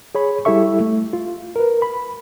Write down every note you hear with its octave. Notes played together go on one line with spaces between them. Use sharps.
G#4 C#5 B5
G3 E4 G4 A4 E5 C#6
A3
F4
A#4 B4
B5